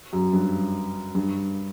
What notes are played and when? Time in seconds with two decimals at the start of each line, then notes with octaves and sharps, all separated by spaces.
0.13 F#2
0.33 G2
1.15 G2